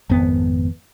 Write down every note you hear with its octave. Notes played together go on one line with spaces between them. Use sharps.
G#1 F2 B3